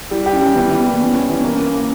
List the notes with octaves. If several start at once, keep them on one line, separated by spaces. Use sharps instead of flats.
G3 E4
G4
C#4
G3
E3 B3
E3
B3
G3 A#3
B3 C#4
C#4
E3
D4
A#3 C#4
A#3
A#3